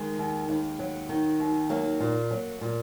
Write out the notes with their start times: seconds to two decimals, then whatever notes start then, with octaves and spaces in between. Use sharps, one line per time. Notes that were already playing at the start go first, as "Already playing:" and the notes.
Already playing: D#3 G#3
0.18 D#2
0.48 D#2
0.79 F#3
1.09 D#3
1.40 D#2
1.70 F#3 A#3
2.00 A#2
2.31 F#3
2.61 A#2